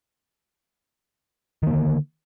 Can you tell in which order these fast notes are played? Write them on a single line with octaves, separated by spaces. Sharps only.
D#3 A#3 D3